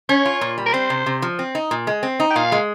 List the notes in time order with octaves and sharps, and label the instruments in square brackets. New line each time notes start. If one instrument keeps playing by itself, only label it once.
[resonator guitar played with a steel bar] C#4 [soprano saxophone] C#5
[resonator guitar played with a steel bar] F4
A#2
G3
[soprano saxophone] A#4
[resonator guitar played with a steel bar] C4 [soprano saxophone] C5
[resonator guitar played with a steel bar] C3
C3
F3
C4
D#4
A#2
G#3
C4
D#4
[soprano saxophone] G5
[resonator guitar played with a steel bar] A#2 [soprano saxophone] F5
[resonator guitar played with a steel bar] G#3